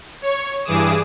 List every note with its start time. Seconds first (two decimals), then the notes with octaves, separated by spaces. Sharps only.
0.22 C#5 C#6
0.64 G2 E3 G#4 D6 D#6 E7